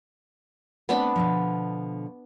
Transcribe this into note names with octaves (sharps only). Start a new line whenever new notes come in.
A3 B3 C4 D4 B5
B2 D3 F3